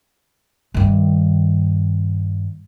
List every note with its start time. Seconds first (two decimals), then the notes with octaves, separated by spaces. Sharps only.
0.74 G2 D#3